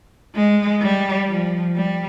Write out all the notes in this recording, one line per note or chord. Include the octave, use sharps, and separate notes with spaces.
G#3
G3
F3
G3